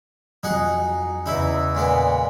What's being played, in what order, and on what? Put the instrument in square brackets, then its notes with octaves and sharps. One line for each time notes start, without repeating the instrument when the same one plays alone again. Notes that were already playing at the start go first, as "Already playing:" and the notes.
[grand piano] F2 F#3 [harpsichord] D#4 G#4 F#5
[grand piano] E2 C#3 [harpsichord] D#4 E4
[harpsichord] A#2 G#3 B3